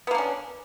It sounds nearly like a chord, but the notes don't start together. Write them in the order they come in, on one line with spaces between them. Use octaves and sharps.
B3 A#3 D4 C#4